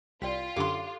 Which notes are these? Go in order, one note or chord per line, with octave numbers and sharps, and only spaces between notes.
C2 F4 D5 G5 B6
F#2 D3 G4 A4 C6 D6